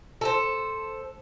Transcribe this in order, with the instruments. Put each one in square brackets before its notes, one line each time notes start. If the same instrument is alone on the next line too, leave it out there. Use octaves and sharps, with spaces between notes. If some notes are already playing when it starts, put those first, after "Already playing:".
[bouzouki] A4 C5